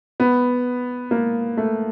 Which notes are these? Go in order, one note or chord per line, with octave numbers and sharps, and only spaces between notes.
B3
A#3
A3